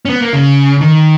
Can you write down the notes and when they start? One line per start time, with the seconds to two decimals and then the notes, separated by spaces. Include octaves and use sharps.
0.05 C#4
0.10 B3
0.22 A#3
0.33 C#3
0.81 D#3